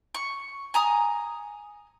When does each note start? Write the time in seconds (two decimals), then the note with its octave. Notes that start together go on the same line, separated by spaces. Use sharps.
0.15 C#6
0.74 G#5 A#5 D#6